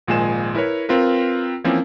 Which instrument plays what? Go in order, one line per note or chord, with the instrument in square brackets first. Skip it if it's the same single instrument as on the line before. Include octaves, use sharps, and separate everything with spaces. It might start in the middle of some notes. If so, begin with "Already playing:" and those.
[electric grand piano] G#1 A#2 F3 G#3 G#5 E7
E4 A#4 B4 C#5
C4 F4 A#4 B4
E3 F3 A#3 C4 C#4 E4